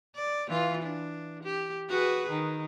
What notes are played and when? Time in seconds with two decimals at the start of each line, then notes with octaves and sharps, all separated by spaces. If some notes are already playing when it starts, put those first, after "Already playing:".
0.15 D5
0.48 E3 F4
0.82 D4
1.44 G4
1.89 F#4 G#4 B4
2.30 D#3